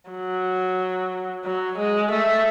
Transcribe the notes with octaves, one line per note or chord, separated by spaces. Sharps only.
F#3
F#3
G#3
A3